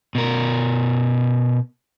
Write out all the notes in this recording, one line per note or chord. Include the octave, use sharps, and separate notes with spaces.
B2 A#4